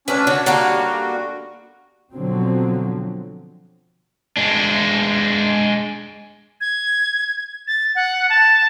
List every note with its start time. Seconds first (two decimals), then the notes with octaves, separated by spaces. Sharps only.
0.08 D2 F3 C#4 D4 B4
0.27 D3 D4 F#4 C#5
0.46 D#2 D3 G3 A#3 F#4 F5 F#5
2.14 B2 D3 F3 F#3 C4
4.37 G#3 D4
6.61 G#6
7.67 A6
7.95 F#5
8.30 A5